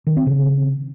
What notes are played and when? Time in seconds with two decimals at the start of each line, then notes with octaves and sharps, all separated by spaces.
0.07 D#3
0.17 C4
0.27 C#3